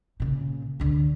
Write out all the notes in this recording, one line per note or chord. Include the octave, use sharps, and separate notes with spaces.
A#2 C#3
D2 D3